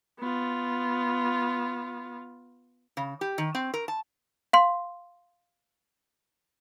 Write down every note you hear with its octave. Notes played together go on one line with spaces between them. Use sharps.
B3 F4
C#3
G4
D#3
C4
A#4
A5
F5 C6